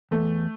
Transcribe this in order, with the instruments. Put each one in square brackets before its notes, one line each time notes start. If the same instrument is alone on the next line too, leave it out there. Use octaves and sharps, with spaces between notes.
[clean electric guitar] E2 [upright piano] A3